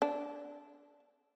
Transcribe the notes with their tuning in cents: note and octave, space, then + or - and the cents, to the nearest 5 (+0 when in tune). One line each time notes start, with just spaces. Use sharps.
D4 -15